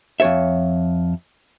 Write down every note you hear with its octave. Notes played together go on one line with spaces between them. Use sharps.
F2 C#5 E5